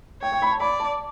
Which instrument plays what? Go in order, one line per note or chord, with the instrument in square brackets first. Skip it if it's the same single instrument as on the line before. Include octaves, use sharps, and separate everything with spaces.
[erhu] C#5 [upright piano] G5
[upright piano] G5
B5
A5
[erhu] D5 [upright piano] B5
[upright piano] A5